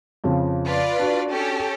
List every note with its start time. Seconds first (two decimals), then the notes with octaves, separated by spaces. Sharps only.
0.24 F2 C#3 F3
0.65 F4 B4 D5
0.99 D4 F#4
1.31 C#4 G4 A4